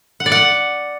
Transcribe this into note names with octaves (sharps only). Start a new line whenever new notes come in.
F#5
D5
F#5